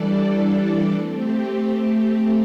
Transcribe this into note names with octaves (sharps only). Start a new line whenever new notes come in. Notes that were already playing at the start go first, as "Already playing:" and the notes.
Already playing: E3 G3 D4 A4 D5
A3 C4 G4